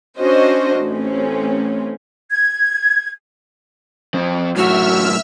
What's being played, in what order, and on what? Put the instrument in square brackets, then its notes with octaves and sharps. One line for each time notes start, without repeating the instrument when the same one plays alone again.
[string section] C#4 D4 F#4 C5 D#5
A1 C4 C#4
[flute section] G#6
[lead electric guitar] F2 C4
[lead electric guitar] F#2 A2 [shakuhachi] F#4 [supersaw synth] E5 E6 F6